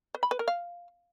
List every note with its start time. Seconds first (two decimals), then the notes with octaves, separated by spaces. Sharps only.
0.15 B4
0.23 B5
0.31 B4
0.39 A#4
0.48 F5